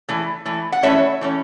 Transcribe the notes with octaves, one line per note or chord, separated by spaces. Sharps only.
E3 A3
E3 A3
F#5
E3 A3 C#4 C#5 E5
E3 A3 C#4